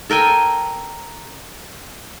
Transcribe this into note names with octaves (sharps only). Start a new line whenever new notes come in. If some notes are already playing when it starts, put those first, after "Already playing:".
A4 A#4 G5 G#5